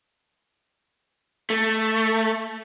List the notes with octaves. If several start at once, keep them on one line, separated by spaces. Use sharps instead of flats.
A3